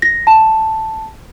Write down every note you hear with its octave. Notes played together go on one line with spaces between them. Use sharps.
A#6
A5